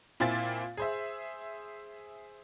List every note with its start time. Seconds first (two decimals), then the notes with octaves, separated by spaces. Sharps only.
0.20 A#2 C4 E4 F4 G#5 A6
0.77 G#4 C5 E5